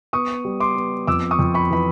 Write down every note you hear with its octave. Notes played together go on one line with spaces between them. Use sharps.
B3 C#6 D#6
G3
C6 D6
B3
F2 D6 E6
C#6 D#6
F2
B5 C#6
E3 B5